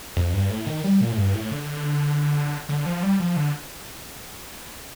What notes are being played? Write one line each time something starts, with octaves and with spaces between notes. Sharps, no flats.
F2
G2
A2
D#3
G3
A#2
A2
G2
A2
D3
D3
F3
G3
F3
D3